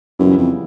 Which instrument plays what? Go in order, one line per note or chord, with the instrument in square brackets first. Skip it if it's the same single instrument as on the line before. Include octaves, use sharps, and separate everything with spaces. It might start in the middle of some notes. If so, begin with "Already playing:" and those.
[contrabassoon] F#2 [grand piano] C#3 E3 G3 B3 E4
[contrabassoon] F2